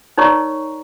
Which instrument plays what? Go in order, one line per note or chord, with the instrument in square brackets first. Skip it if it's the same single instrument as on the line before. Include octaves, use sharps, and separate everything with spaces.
[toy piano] D#4 A#4 C#5 D5 A#5 C#6